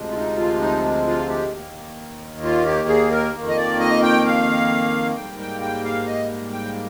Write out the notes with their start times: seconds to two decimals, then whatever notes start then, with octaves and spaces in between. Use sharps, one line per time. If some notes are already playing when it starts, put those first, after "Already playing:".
Already playing: D2 C3 F3 G#3
0.09 F4
0.16 D#4
0.37 F4
0.60 D#4
1.07 F4
1.29 G4
1.52 D#2 D#3 A#3
2.43 F4
2.66 G4
2.88 G#4
3.11 A#4
3.34 F2 D#3 A#3
3.49 D#5
3.57 D5
3.79 D#5
4.03 G5
4.26 F5
5.16 G#2 G3 A#3 G5
5.39 G5
5.61 G5
5.84 F5
6.07 D#5
6.53 G5